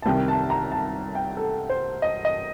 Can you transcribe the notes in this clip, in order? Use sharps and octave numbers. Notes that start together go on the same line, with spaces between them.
A5
C2 C3 D#3 G5
A5
A#5
A5
G5
A4
C5
D#5
D#5